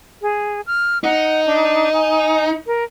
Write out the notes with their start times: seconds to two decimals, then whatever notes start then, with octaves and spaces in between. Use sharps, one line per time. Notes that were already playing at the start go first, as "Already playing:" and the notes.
0.22 G#4
0.66 F6
1.04 D#4 F#5
1.46 D4
1.93 G#5
2.66 A#4